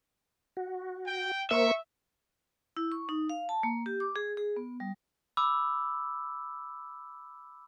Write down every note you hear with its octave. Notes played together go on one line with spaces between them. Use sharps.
F#4
G5
A#3 A#4 C5 E5 C#6
E4
C#6
D#4
F5
A5
A#3
G4
D6
G#4
G#4
B3
G3
B5 D6 E6